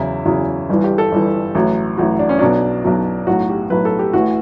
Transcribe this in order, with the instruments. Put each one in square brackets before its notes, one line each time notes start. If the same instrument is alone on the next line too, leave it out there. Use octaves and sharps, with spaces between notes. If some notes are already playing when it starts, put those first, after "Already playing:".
Already playing: [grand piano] E2 C#3 F#3 E4
E2 C#3 F#3
G1 G2 E3
G4
A4
G1 G2 E3
A1 A2 F#3
A1 A2 F#3 F#4
D4
C#4
B1 B2 F#3 D4
B1 B2 F#3
B1 A2 F#3 F#4
G4
B1 A2 F#3 B4
A4
G4
A1 A2 E3 F#4